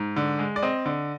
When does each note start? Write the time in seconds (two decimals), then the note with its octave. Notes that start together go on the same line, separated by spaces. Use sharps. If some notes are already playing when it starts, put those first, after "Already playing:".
Already playing: G#2
0.16 D3
0.39 G#3
0.56 D5
0.63 C4 D#5
0.86 D3